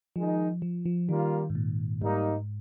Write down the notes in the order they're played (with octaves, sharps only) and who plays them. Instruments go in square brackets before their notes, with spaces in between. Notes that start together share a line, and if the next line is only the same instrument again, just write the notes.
[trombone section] D#3 G#3 D#4 [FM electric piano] F3
[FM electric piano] F3
F3
[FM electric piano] D#3 [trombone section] G3 A#3 F4
[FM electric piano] G#2
A#2
[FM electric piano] G#2 [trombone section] G3 A#3 D#4